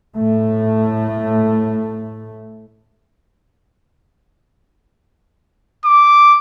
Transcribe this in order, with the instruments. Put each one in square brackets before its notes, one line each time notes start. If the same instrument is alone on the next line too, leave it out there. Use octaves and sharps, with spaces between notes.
[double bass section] A2 A3
[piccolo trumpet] D6